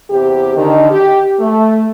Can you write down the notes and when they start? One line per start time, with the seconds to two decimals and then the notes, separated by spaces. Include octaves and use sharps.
0.10 E2 C3 G4
0.56 D3 D#3
0.91 G4
1.40 A3